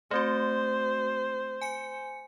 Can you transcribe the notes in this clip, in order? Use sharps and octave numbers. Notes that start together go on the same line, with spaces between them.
A3 C4 F#4 C5
G#5 C#7